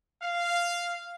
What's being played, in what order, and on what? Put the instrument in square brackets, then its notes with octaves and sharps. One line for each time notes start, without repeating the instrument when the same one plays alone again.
[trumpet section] F5